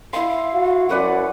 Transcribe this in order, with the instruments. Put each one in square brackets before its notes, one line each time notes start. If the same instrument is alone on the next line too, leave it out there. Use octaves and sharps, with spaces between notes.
[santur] E4 C6 [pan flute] F5
[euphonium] F#4
[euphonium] F#2 [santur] F#4 B4 D5 [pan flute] F#5